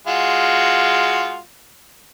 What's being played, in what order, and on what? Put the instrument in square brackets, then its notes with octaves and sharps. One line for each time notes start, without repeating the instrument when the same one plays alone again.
[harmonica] G#3 F4 F#4